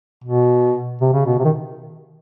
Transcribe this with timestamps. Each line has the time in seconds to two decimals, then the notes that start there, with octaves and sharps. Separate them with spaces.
0.24 B2
1.01 C3
1.14 C#3
1.26 B2
1.39 C3
1.45 D#3